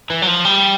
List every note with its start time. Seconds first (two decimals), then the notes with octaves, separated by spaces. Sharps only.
0.10 E3
0.22 F#3
0.27 F3
0.45 G3